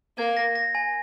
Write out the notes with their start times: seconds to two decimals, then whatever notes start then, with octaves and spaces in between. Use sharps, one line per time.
0.18 A#3 G#6
0.37 A#6
0.55 A#6
0.75 G#5